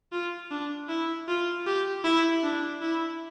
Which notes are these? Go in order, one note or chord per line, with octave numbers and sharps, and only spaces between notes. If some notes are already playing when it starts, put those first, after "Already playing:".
F4
D4
E4
F4
G4
E4
D4
E4